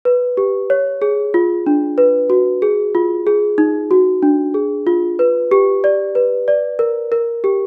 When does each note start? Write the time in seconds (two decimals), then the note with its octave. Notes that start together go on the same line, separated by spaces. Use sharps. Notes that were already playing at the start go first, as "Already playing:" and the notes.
0.05 B4
0.37 G4
0.70 C#5
1.02 G#4
1.34 F4
1.67 D4
1.98 B4
2.30 F#4
2.62 G#4
2.95 F4
3.27 G#4
3.58 D#4
3.91 F#4
4.23 D4
4.54 G#4
4.87 F4
5.19 B4
5.51 G4
5.84 D5
6.15 B4
6.48 D5
6.79 A#4
7.12 A#4
7.44 G4